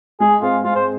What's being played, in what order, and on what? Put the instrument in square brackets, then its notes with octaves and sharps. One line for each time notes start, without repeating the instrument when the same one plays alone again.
[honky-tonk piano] G#3 [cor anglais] G#4
[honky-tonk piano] C4 G#4 [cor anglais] F4
[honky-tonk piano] G#3 [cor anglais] F4
[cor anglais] C5